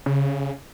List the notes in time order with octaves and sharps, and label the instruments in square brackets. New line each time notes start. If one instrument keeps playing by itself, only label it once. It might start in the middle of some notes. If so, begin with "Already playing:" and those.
[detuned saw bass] C#3